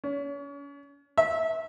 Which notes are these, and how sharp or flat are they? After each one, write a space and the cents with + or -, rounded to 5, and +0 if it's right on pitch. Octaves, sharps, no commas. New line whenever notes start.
C#4 +35
E5 -30